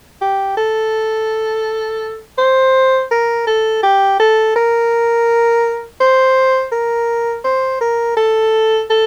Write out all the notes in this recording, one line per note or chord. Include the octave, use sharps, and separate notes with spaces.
G4
A4
C5
A#4
A4
G4
A4
A#4
C5
A#4
C5
A#4
A4
A4